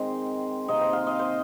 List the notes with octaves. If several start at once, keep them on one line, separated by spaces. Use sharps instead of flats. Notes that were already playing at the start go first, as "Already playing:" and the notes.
Already playing: D#3 G#3 C4 C5
C3 D#3 A#3 D#4 D#5
C5
F5
D#5
C5